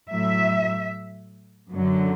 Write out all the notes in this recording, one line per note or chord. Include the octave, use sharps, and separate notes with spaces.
A2 F#3 E5
F#2 D3 F#3